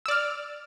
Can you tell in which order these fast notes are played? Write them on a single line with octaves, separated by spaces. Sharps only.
E6 D5 F6